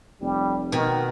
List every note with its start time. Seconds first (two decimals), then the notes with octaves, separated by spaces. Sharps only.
0.21 F1 G3
0.72 B2 D#3